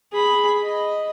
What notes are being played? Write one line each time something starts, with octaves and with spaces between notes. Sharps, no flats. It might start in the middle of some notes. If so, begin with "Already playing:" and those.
G#4 B5
D#5